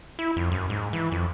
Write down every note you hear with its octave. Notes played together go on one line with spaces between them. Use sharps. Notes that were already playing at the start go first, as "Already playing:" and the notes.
E4
F2
F#2
G#2
E3
F2